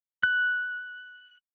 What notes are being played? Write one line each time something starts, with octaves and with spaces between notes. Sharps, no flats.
F#6